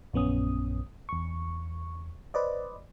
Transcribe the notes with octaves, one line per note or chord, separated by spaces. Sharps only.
A#1 F#2 B3 C#4 D#6
E2 C#6
B4 C5 D5 D#5